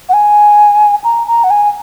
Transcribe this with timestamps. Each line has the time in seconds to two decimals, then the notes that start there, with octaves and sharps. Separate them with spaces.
0.09 F#5
0.13 G#5
1.04 A#5
1.27 A#5
1.44 F#5
1.50 G#5